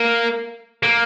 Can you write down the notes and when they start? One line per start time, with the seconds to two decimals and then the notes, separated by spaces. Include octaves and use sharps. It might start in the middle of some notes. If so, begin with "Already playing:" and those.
Already playing: A#3
0.83 A#3